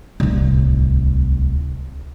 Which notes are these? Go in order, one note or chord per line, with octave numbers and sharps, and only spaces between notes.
D1 C2